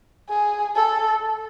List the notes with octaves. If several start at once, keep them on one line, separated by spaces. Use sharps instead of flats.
G#4
A4